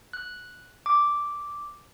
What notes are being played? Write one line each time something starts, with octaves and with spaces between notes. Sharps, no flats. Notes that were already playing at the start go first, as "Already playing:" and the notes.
F#6
D6